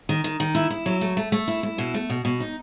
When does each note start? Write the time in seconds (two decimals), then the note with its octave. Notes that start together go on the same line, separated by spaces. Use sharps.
0.09 D#3
0.24 D#3
0.40 D#3
0.55 E4
0.70 E4
0.86 F#3
1.01 A3
1.17 A3
1.32 A3
1.48 E4
1.63 E4
1.78 B2
1.94 A3
2.10 B2
2.25 B2
2.40 D#4